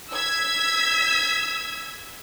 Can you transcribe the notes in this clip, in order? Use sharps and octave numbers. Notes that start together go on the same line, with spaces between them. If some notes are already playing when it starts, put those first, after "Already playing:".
E6 G#6 B6